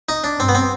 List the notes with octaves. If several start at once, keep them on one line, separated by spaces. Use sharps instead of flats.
D#4
D4
G2 C4
B3
C4